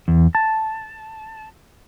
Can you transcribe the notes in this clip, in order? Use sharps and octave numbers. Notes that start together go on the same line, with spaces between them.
E2
A5